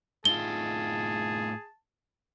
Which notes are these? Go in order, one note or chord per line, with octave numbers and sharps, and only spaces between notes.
A2 D#4 F4 G#4 A5 G7